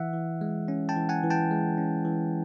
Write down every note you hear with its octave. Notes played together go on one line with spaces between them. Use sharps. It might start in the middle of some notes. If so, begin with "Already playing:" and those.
Already playing: E3 E5 F#5
E3
G#3
C#4
G5 A5
E3
F#5 G#5
E3
G5 A5
G#3
C#4
E3